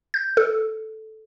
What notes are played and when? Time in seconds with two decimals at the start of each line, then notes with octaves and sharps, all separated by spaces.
0.14 G6
0.37 A4